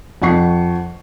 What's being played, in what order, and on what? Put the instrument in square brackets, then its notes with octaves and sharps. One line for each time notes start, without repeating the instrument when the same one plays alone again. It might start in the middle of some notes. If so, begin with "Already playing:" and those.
[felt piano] F2 F#5 C#6 C7